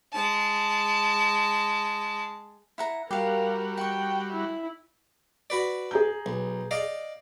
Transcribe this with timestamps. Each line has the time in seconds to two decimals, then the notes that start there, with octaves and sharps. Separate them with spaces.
0.13 G#3 A5
2.78 E4 F#5 A#5
3.11 G3 F#4 G4 A#4 F5
3.77 F#5 G5 C#6
4.32 E4
5.50 F#4 B4 D5
5.91 G#4 A#5 G6
6.26 B1
6.71 D5 D#5 F5